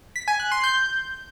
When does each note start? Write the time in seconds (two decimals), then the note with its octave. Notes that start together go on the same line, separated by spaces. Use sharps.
0.16 B6
0.28 G#5
0.40 F#6
0.52 C6
0.64 G6